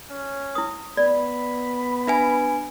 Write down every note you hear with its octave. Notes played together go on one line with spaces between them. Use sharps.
C#4
E4 D#6
B3 D5 B5
D4 B4 E5 G#5